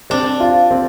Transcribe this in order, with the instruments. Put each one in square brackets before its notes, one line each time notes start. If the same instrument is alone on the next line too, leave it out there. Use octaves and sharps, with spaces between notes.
[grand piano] C4 [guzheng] D4
[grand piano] F4
C4